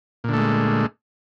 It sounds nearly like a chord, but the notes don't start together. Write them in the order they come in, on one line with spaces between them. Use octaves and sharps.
A#2 D3 A3 G#3